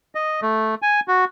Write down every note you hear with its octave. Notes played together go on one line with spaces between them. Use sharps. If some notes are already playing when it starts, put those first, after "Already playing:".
D#5
A3
G#5
F#4